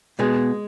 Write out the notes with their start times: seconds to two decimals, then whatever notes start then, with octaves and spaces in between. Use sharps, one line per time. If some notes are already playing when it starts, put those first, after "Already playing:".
0.19 B2 G#3 B3 G#4